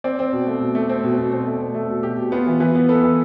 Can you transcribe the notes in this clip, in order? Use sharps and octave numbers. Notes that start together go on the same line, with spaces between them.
C4 D5
C4
B2
A3
B2
A3
C4
B2
B2
C4
A3
C4
A3 A4
B2
B2 G4
B2
B3 F4
E3
E3 B4
B3
B3 A4
E3